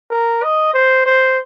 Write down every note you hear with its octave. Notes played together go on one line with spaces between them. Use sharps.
A#4
D#5
C5
C5